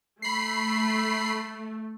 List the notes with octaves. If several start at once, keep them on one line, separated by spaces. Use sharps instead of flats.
A3 B5 C7